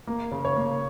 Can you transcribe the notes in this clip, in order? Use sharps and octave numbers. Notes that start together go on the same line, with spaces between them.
A#3
C#3
C#5
A#3